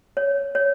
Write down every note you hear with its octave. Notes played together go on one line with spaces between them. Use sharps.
C#5
C#5